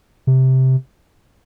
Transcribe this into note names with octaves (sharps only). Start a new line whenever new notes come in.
C3